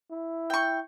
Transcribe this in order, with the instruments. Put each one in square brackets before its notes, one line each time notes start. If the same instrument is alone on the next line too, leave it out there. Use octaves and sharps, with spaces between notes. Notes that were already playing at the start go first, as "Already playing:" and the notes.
[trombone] E4
[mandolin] G5 C#6